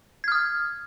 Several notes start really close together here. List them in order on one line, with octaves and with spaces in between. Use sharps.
G#6 F6 D#6